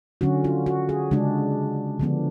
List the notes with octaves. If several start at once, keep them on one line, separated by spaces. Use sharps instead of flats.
D3 F#3 C#4 F#4
F4
F#4
G#4
C#3 G#3 D4
D3 F3 B3 D4